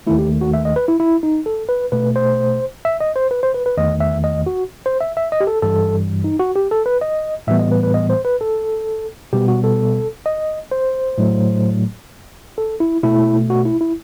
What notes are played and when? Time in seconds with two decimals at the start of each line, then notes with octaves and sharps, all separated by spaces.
0.07 D#2 D#3 A3 E4
0.19 G4
0.41 F#4
0.54 E5
0.65 D#5
0.76 B4
0.88 E4
1.00 E4
1.23 D#4
1.46 A4
1.69 B4
1.92 B2 A3 B4
2.16 C5
2.85 E5
3.00 D#5
3.16 C5
3.31 B4
3.43 C5
3.54 B4
3.66 B4
3.77 E2 D#3 A3 D#5
4.00 E5
4.24 D#5
4.46 F#4
4.86 C5
5.01 E5
5.17 E5
5.32 D#5
5.41 G4
5.47 A4
5.62 G2 E3 G3 A4
6.24 D#4
6.40 F#4
6.56 G4
6.71 A4
6.86 B4
7.01 D#5
7.47 A2 E3 G3 B3 E5
7.59 D#5
7.71 B4
7.83 B4
7.94 D#5
8.10 C5
8.25 B4
8.41 A4
9.33 B2 G3 B3 G4
9.48 F#4
9.64 A4
10.26 D#5
10.71 C5
11.18 A2 F#3 A3
12.58 A4
12.80 E4
13.03 B2 A3 E4
13.50 F#4
13.65 E4
13.81 E4